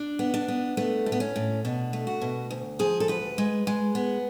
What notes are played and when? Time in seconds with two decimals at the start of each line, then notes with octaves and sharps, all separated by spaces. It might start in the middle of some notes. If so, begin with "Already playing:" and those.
Already playing: D4
0.19 B3
0.34 D4
0.48 B3
0.77 A3 B3
1.06 A2
1.12 B3
1.20 C#4
1.36 A2
1.65 B2 D4
1.93 A3
2.07 F#4
2.21 B2
2.51 D2
2.79 F3 G#4
3.00 A4
3.08 D2 B4
3.38 G#3
3.67 G#3
3.95 B3